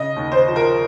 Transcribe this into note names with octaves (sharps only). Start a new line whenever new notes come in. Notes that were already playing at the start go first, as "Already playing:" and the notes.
Already playing: C#3 D#5
D#2
C5
F3
A#4